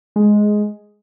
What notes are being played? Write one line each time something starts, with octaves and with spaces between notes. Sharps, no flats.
G#3